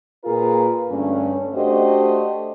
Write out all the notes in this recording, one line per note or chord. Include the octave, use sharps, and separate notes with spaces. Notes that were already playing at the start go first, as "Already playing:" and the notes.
A#2 F4 G#4 A#4 B4
G2 D3 A3 C#4
A3 D4 F#4 G4 C5 D#5